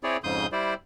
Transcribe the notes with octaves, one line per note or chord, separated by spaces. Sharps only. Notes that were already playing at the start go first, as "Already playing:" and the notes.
C4 E4 G#4 C#5 D5
F2 G#2 C#3 C6 D#6 G6
G3 E4 C5 D5